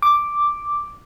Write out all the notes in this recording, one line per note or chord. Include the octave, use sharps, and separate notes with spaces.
D6